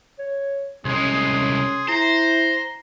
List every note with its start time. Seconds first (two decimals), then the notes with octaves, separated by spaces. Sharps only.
0.19 C#5
0.85 C2 G#3 C#4 G#4 C6
1.88 E4 C5 A#5